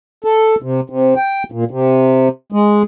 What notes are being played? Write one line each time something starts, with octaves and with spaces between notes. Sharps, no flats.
A4
C3
C3
G5
A#2
C3
G#3